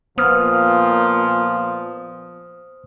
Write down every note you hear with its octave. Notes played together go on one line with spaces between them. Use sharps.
A#2 F3 B3 C5 D#6 F6